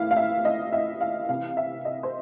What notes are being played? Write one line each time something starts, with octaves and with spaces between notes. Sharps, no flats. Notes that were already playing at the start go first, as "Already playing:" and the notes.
Already playing: A2 E3 E5 F5
F5
E5
D#5
E5
F5
C3 E3 F5
E5
D#5
C5